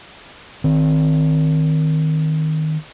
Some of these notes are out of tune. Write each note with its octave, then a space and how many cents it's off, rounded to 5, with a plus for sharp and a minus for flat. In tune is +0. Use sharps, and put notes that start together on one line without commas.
D#3 +0 C4 +0